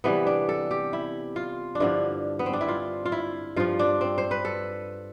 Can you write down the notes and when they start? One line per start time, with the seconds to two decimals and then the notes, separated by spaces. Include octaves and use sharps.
0.04 C3 E3 G3 B3
0.27 D4
0.49 A4
0.71 G4
0.93 E4
1.36 F4
1.75 D4
1.80 G2 D3 F3 E4
2.39 B3
2.46 C4
2.53 D4
2.61 E4
2.68 F4
3.06 F4
3.12 E4
3.56 G2 F3 F4
3.79 D4
4.01 C4
4.18 C5
4.31 B4
4.45 A4